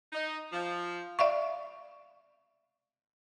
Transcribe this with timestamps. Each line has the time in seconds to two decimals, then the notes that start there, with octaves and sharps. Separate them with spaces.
0.13 D#4
0.52 F3
1.19 D5 E5 F5 C#6